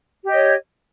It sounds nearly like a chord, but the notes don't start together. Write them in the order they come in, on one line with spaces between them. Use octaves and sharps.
G4 D#5 C#5